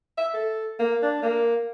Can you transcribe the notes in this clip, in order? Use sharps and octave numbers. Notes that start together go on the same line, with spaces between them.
E5
A4
A#3
D4
A#3